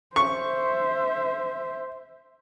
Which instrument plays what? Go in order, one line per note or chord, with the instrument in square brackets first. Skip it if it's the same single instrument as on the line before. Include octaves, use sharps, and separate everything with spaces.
[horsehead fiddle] C5 E5 [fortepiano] C#6